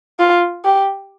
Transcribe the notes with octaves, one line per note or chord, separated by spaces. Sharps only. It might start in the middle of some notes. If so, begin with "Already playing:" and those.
F4
G4